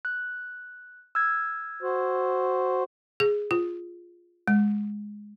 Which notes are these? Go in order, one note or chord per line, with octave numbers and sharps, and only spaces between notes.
F#6
E6 F6 G#6
F#4 C5
G#4
F4
G#3